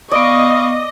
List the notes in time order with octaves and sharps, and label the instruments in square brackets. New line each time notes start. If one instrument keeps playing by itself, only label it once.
[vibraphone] B3 D#6 [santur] D5 [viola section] D#5 [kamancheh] F5 C#6